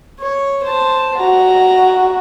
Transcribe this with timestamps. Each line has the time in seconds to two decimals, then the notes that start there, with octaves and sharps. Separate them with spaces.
0.19 C#5
0.64 C5 A5
1.19 F#4 A#5